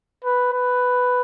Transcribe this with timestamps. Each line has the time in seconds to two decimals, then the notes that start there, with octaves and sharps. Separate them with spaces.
0.24 B4
0.53 B4